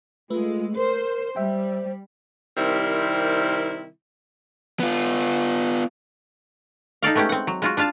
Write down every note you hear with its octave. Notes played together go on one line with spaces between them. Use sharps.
G#3 A3 F4 B4
A#4 C5
G3 C5 E5 G5
C3 D#3 G3 C4 E4 A#4
B3 F4
D#4 A4 D5 F5
G#3 A3 B3 C#4 G4
C4 F#5
F#3
G#3 F4 F#4
D4 F4 F5 A5